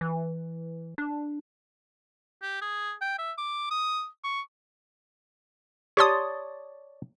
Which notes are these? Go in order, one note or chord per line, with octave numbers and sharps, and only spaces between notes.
E3
D4
G4
G#4
G5
E5
D6
D#6
C#6
G4 C#5 D5 A5 C6 D#6